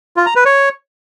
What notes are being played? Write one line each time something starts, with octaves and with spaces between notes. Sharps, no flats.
F4
A#5
B4
C#5